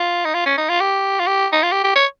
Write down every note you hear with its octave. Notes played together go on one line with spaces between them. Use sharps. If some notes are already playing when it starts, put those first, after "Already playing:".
Already playing: F4
D#4
F4
C#4
D#4
F4
G4
F4
G4
D#4
F4
G4
G4
C#5